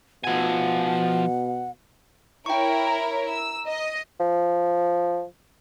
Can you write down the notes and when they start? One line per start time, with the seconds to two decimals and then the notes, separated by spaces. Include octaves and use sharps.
0.24 B2 F3 F#5 G#5
2.46 E4 A#4 C#5 G5 C#6
2.87 A#5
3.30 E6
3.68 D#5
4.20 F3